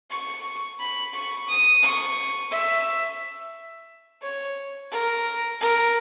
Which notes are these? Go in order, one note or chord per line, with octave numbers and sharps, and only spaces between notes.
C#6
B5
C#6
D#6
C#6
E5
C#5
A#4
A#4